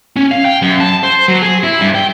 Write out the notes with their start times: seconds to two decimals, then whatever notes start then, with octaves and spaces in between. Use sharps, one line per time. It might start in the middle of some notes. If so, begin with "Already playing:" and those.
0.16 C#4
0.31 F5
0.45 G5
0.62 F#2
0.80 A5
1.03 C5
1.28 F#3
1.42 G#4
1.63 E4
1.81 G2
1.95 G5